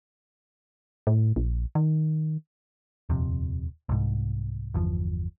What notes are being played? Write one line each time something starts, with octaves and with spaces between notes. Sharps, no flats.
A2
A#1
D#3
D#1 F2 C3
C2 G#2
G1 E2 F3